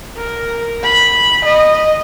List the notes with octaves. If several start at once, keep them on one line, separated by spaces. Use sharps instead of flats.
A#4
B5
D#5